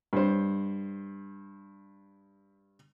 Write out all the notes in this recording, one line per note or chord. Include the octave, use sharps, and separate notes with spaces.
G2 C5